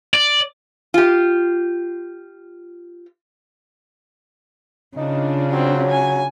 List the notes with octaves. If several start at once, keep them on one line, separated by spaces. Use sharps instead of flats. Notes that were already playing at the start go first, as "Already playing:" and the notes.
D5
F4 G4
C#3 D4 D#4 F4
F#3 C4
G#5